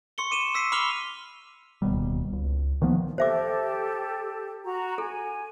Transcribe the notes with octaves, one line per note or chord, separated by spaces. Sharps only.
C6 C#6 C#7 G7
D6 D#7 E7 G7
E6 B6 C7 D#7
B5 D6 F6 F7 G7
D1 D#2 B2 G3
C#2
D#3 F3 A#3 B3
G4 A4 C5 E5 D6
F#4 A#5
A4 G#5